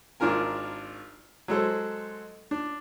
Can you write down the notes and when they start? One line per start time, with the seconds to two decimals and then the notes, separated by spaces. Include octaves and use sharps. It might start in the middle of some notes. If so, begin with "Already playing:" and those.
0.20 G#1 D4 F4 A#4 G#5
1.48 F#3 G#3 A4 C5
2.51 D4